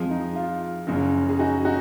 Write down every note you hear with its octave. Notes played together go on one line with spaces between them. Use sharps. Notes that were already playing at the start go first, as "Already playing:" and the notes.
Already playing: F2 F3 G#3
D#4
F4
F#1 F#2 F3
G#4
D#4 F#4
D#4 F#4